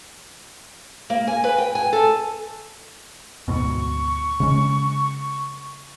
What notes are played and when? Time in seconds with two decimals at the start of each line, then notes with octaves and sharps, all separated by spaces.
1.10 A#3
1.27 G#5
1.44 B4
1.58 G5
1.75 G#5
1.93 A4
3.48 D2 G#2 B2 C#6
4.40 C#3 G#3 C#4